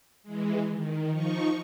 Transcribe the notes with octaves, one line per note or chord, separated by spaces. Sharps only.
E3 G#3
D#3
F3 D#4 C#6